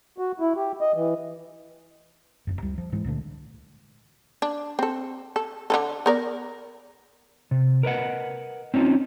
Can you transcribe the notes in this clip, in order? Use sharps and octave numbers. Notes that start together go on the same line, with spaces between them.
F#4
E4
G4
D#5
E3
E1 F#2
C#2 G3
F3
G#2 E3 G#3
C#2 A#2 D3 A3
D4
C4 A4
A4
D3 E3 A4
B3 A#4 D5
C3
A#4 B4 D#5 F#5
C4 C#4 D#4 F4